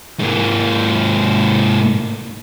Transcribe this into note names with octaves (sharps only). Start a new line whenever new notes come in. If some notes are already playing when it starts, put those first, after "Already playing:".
G#2 A#3